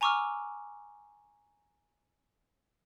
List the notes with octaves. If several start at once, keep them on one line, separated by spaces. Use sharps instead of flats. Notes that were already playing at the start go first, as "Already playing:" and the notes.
G#5 A#5 C#6 D6 E6 F6